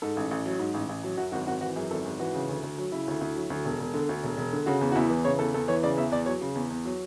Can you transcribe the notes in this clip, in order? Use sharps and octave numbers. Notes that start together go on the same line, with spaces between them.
G#2 A4
A1
A1
F#3
G#2
A1
A1
F#3
F#2 F#4
G#1 F#4
G#1 F#4
E3 F#4
F#2 G#4
G#1 A4
G#1 G#4
E3 F#4
C#3
D2
D2
F#3
C#3 E4
D2
D2
F#3
D2
E1
E1
D3
D2
E1
E1
D3
C#3 F#4
E2
F#4
E2 E4
E3
C#3 C#5
E2 A4
E2 A4
E3 C#5
C#3 D5
E2 E5
E2 D5
F#3 C#5
C#3
E2
E2
F#3